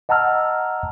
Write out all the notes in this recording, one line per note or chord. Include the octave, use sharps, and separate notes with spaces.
D#5 F#5 A5 A#5 E6 F6